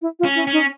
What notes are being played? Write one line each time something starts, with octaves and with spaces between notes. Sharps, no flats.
E4
F4
C#4
E4
C#4
D#4